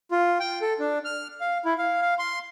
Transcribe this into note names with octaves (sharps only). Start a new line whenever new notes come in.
F4
G5
A4
D4
F6
F5
E4
F5
F5
C6